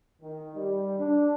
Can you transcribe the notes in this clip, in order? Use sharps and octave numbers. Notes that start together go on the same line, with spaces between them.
D#3
G3
D4